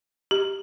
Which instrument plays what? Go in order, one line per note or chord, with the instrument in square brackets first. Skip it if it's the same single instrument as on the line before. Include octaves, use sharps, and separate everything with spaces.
[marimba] G4